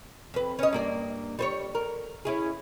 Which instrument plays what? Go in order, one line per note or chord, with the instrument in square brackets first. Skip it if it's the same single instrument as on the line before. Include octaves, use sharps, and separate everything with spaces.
[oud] F2 B4
C#4 D#5
G2 A#3 D5
G3 C5 C#5
A#4
C#4 E4 G#4